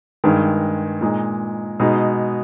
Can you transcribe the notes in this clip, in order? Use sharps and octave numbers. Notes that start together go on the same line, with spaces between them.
G2 D#3 G#3
A#2 G#3 D#4
B2 G#3 D#4